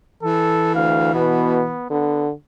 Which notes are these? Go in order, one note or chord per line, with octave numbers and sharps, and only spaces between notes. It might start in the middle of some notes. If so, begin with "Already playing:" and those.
E3 A4
D2 F5
B2 B3
D3 B3